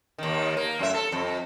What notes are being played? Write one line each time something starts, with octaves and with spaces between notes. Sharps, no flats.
D#2 D#3
A#3
F#2 A2 E5
A4
F2